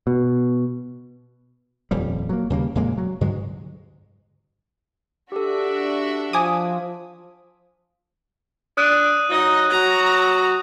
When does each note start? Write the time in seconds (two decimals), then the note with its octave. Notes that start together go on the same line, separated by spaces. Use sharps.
0.07 B2
1.91 D#1 F2 G3
2.29 F#3 A#3
2.50 D#2 C#3 G3 A#3
2.75 F2 A#2 G#3 A#3
2.98 F#3
3.21 G2 D3 F#3 G#3
5.32 D4 F#4 G4 A4 E5
6.33 F3 G#5 D6 D#6
8.77 D4 D#6 F#6 D#7
9.30 F#3 D#4 D#5
9.70 F#4 A#5